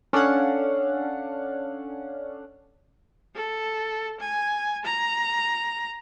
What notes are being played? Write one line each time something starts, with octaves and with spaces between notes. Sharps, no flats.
C#4 D4 A4 F5 F#5
A4
G#5
A#5